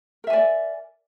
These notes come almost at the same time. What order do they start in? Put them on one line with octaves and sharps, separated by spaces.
A#4 E5 G#5 D5